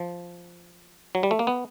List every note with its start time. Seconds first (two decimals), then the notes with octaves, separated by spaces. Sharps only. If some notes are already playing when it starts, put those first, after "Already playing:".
Already playing: F3
1.15 F#3
1.23 G3
1.31 A3
1.39 A#3
1.47 B3